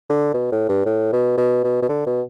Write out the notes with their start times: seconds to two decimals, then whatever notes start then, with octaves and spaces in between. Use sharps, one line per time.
0.09 D3
0.34 B2
0.52 A2
0.69 G2
0.86 A2
1.13 B2
1.38 B2
1.64 B2
1.82 B2
1.89 D3
2.07 B2